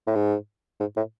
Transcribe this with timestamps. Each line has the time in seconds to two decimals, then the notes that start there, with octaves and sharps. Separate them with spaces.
0.07 A2
0.15 G#2
0.80 G#2
0.96 A2